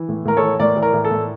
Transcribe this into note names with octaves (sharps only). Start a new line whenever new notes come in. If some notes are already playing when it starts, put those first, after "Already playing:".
Already playing: E3
A2
A2 A#4
A4 C#5
E3
A2 A#4 D5
E3
A#4
A2
A4
A2